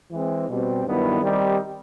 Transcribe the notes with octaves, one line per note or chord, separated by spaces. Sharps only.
E3 G#3 C4
B2 G3 C4
G2 D#3 F#3 B3 E4
D#3 G3 C4 D#4 G4